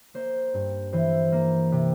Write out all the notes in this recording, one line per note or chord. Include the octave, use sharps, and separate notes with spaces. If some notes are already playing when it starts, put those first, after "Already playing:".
A#3 C5
G2
E3 C5
A#3
C3